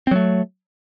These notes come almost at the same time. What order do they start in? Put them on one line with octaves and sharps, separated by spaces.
C4 F#3 A3